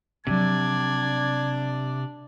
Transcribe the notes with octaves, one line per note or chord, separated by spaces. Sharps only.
C3 F3 F#3 D4 D5 G#6